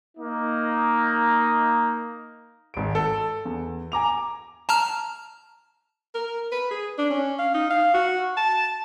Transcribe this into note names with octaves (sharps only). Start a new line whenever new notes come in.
A#3 D#4
G#1 D7
A4
E2
G#5 A#5 D6 F7
A5 A#5 F6
A#4
B4
G#4
D4
C#4
F5
D#4
F5
F#4
A5